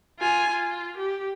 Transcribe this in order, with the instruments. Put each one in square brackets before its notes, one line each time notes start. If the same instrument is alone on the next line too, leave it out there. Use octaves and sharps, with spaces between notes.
[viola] F4 G#5
F4
G4